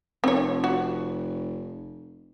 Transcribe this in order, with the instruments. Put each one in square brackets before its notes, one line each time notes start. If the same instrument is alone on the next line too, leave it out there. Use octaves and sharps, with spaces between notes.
[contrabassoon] F1 [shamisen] C4 C#5
[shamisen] F#4